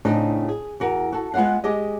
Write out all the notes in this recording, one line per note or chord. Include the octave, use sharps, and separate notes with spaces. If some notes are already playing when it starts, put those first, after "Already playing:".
A2 C#3 A3 C4 D4 D#4
G#4
E2 F#4 A#4
F#4 A4
G#3 B3 F4 F5 F#5
G#3 G4 G#4 D#5